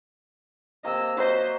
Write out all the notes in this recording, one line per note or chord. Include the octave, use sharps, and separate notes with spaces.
C3 A#3 D#5 F5 E6
F#3 C5 D#5 E5